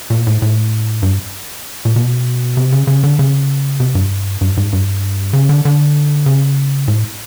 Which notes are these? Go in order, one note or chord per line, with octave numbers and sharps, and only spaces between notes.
A#2
A2
A2
G2
A#2
B2
C3
C#3
C#3
D3
C#3
C3
G2
G2
G#2
G2
C#3
D3
D3
C#3
A2